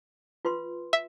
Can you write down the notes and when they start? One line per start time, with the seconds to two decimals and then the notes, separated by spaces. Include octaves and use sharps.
0.45 F4 B4 C6
0.93 E5